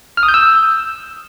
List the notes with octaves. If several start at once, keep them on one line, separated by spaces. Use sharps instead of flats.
F6
D#6
G6
E6